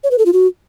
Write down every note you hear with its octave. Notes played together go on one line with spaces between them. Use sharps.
C#5
B4
A4
F4
F#4